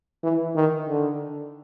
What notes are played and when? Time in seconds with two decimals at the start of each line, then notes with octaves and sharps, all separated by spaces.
0.23 E3
0.55 D#3
0.88 D3